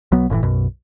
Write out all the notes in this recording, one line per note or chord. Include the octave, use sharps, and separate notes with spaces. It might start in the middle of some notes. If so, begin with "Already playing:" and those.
B1 F#3 B3
F#1 A2 C3 E3
B1 F#2 B2